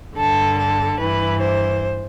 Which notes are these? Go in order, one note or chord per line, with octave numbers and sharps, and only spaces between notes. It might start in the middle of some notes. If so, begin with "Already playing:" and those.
G2 D3 A4
A4
G2 E3 B4
C5